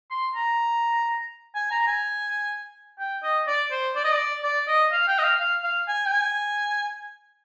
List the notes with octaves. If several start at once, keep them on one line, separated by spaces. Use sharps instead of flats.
C6
A#5
G#5
A#5
G#5
G5
D#5
D5
C5
D5
D#5
D5
D5
D#5
F5
G5
D#5
F5
F5
F5
G#5
G5
G#5